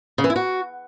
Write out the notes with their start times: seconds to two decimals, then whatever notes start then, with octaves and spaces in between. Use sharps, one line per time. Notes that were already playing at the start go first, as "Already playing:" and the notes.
0.18 C#3
0.24 E3
0.30 E4
0.36 F#4